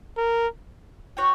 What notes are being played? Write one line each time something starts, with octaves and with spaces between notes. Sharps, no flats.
A#4
F#4 C#5 G5